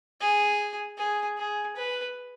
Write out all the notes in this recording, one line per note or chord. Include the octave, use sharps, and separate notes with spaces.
G#4
G#4
G#4
B4